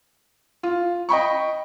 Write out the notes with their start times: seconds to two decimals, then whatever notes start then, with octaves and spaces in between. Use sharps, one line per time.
0.63 F4
1.09 D#5 G5 B5 C#6